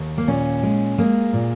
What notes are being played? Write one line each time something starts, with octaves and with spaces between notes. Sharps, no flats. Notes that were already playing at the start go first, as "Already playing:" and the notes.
Already playing: D#2
A#3
A#2 C#4
G#3
G#3 A#3
A#2